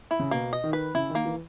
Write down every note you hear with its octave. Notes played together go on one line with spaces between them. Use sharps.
E4
C#3
B2 A#3
D#5
D#3
B4
C#3 E4
D#3
A#3
E3